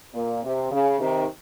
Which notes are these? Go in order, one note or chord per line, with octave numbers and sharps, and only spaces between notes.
A#2
C3
C#3
C3 D#3